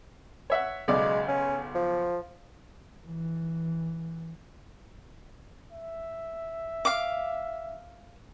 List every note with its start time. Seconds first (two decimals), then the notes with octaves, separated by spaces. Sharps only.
0.50 C#5 E5 F#5
0.88 B1 C#3 G#3 D5
1.28 C#4
1.75 F3
3.07 E3
5.72 E5
6.85 F5 D6